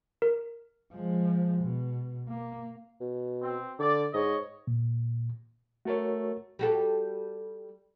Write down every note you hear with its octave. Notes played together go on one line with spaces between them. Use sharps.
A#4
F3 G#3
B2
A#3
B2
C4
D3 D5
G#2 C#5 D#5
A#2
A3 F#4 A#4 C#5
G3 F#4 A4